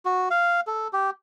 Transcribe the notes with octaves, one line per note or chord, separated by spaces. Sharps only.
F#4
F5
A4
G4